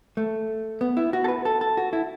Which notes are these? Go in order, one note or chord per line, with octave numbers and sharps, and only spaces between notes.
A3
B3
E4
F#4
A4
B4
A4
A4
F#4
E4